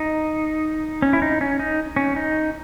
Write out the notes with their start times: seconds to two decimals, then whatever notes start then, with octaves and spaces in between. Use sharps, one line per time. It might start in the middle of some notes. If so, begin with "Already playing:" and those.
Already playing: D#4
1.02 C#4
1.13 E4
1.22 D#4
1.41 C#4
1.59 D#4
1.96 C#4
2.16 D#4